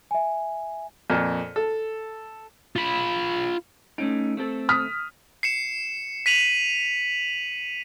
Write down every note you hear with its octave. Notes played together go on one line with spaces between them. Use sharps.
E5 G#5
F2 A#2
A4
F4 B5
A3 C#4 D#4 D7
A3 C4 A4
D#6 F6 B6
C7 C#7 E7
B6 D#7 F7 F#7